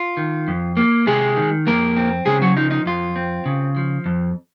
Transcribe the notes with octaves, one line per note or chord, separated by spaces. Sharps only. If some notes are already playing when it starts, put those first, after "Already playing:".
Already playing: F4
D#3
F2
A#3
C3 G#3 G#4
D#3
F2 A#3 A#4
C4
C#3 G#3 G#4
F#3 F#4
F3 D#4
D#4
F2 F4
C4
C#3
F3
F2